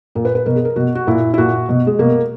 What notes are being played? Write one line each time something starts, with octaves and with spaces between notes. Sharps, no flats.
A#2 A#4
B4
B4
B2 A#4
G#4
A#4
B2 F#4
F#4
A#2 E4
E4
A#2 F#4
B2
G#3
B2 A#3